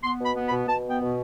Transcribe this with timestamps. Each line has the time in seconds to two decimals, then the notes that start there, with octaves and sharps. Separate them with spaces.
0.03 B3 C6
0.19 B2 B5
0.36 B3
0.47 B5
0.51 B2
0.68 B2 A5
0.84 B3
0.89 G5
1.00 B2